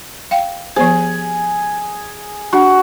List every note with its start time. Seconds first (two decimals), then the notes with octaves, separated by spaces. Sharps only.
0.31 F5 G5
0.76 F3 B3 G#4 C5
2.53 D4 F#4